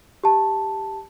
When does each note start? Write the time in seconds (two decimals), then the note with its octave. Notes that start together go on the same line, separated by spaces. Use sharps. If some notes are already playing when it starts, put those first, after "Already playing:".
0.24 G4 A5